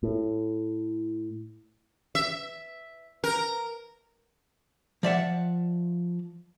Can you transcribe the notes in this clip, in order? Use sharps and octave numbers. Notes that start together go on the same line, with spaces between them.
A2
E5
A#4
F3 D5 E5 F#5